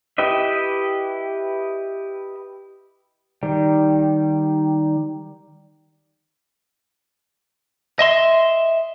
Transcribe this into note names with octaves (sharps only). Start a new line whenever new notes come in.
E4 G4 B4 D#5 E5
D#3 G3
D#5 E5 C6